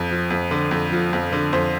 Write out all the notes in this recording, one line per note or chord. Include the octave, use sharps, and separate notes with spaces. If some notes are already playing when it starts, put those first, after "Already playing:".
Already playing: F2
F3
F2
D3
F2
F3
F2
D3
F2 C5